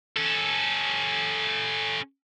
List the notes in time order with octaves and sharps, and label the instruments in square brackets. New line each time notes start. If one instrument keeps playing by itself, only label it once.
[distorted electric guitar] C#4 A4